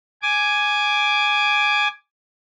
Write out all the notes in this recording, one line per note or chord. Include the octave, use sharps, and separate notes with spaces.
G#5 D6